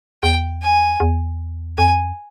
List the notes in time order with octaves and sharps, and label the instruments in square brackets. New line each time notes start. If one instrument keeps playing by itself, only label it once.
[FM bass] E2 [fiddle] G5
[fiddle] G#5
[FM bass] E2
[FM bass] F2 [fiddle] G#5